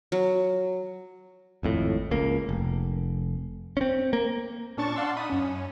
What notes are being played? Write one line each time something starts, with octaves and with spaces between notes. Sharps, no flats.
F#3
G#1 F2 A2
C#2 A#3
F1
C4 C#4
A#3
A#2 C#4 D4 A5 C#6 A6
D5 F5 F#5 A5 C6 E6
D#4 B5 D#6 D#7
F#2 C#4